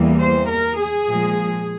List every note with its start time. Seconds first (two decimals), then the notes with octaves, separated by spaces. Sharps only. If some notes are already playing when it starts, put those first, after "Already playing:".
Already playing: E2 E3 G3 A#3
0.20 C5
0.49 A#4
0.78 G#4
1.07 A#2 F3 G#3